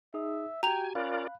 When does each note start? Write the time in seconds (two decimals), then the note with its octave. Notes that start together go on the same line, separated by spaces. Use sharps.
0.14 D#4 G#4 E5 D#6
0.63 F#4 G4 G5 G#5 A#5 F7
0.95 C#4 F4 A#4 D5 F5 B5 F#6